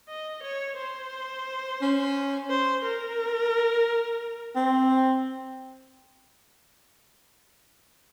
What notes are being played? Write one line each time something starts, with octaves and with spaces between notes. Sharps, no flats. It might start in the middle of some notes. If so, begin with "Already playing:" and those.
D#5
C#5
C5
C#4
C5
A#4
C4